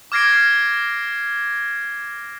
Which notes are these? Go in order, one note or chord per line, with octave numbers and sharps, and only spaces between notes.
D6 F6 G#6 A#6 C7 D7